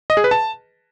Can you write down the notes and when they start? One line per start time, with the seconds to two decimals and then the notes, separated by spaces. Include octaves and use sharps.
0.10 D#5
0.17 G#4
0.24 B4
0.31 A5